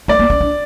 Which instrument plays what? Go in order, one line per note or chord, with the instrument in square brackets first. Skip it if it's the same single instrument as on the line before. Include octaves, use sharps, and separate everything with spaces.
[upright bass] A3 [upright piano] D5
[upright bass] A#3
C#4
D4